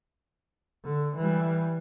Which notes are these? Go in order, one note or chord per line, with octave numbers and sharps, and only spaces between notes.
D3
E3 G3